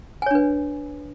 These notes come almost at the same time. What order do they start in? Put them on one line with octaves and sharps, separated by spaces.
G#5 C#5 D4 B4